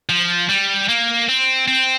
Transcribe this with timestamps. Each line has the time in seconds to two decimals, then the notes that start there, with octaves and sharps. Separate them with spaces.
0.09 F3
0.49 G3
0.89 A#3
1.29 C4
1.68 C4